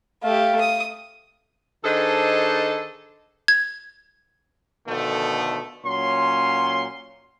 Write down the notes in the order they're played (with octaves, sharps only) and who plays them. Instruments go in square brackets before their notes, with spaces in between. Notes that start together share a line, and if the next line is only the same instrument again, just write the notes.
[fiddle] A3 G4 [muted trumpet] F5
[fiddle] D#6
[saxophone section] D#3 D4 G#4 A4 C5 D#5
[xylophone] G#6
[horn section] B2 D3 D#3 F3 A3
A#2 F#3 C#4 C6